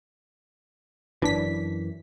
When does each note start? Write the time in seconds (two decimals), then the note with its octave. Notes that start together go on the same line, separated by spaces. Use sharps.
1.22 G1 F#2 E3 D4 B6